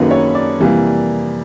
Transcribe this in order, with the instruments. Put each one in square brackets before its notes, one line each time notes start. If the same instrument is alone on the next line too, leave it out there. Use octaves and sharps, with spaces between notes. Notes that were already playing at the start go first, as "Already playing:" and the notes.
Already playing: [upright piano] F#2 D#3 F#3 A#3 G#4 A4 B4
C#5
D5
F2 C3 E3 G3 A#3